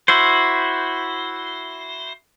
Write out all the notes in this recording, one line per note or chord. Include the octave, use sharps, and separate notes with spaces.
E4 F#4 C5